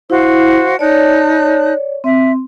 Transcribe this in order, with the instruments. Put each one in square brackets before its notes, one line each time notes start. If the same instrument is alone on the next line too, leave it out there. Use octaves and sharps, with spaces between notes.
[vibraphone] E4 [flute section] F#4 C5 F5
[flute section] D#4 A5 F#6 [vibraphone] C#5 D5
[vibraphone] C4 [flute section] E5